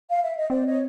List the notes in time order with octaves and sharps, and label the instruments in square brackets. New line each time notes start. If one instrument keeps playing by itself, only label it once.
[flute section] F5
E5
D#5
[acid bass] C4 [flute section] C5 D5
[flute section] C#5 D#5